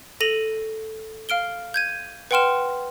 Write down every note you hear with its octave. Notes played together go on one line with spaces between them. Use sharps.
A4 A#6 D#7 F7 F#7
F5 F6 D7 G7
G6 G#6 D#7
B4 F#5 G5 C6 F6 E7